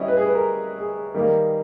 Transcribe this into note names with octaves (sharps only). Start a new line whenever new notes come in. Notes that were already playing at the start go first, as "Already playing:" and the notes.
Already playing: G3 C#4 E4 C#5 D#5
B4
G#4
B4
A#4
G#4
D#3 G3 A#3